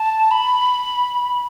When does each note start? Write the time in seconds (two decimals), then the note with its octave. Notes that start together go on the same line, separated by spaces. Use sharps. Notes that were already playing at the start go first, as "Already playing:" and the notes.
Already playing: A5
0.31 B5